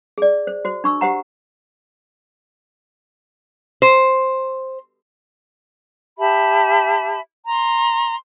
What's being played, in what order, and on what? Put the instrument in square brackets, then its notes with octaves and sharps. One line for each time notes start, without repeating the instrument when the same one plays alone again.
[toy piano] G#4 D5
C5
F#4 C5
D4 C#6 E6
G4 C5 F#5 A#5
[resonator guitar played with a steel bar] C5
[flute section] G4 E5 A5 B5
A#5 C6